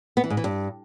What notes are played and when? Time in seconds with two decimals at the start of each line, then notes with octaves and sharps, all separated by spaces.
0.17 B3
0.24 E3
0.30 G#2
0.37 E3
0.44 G2